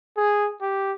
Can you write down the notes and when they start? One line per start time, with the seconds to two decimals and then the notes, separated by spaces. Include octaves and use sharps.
0.17 G#4
0.61 G4